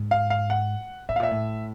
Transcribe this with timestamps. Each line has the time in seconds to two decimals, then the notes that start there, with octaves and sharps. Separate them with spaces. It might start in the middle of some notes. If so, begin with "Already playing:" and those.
Already playing: G#2
0.11 F5
0.30 F5
0.50 F#5
1.09 A2 E5
1.16 F5
1.20 A#2 E5
1.31 A2